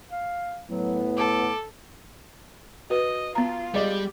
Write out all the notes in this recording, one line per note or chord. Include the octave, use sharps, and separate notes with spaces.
F5
A2 F#3 B3
A4 D6
F#4 B4 D#5
B3 F4 A#5
G3 G#3 D5 D#5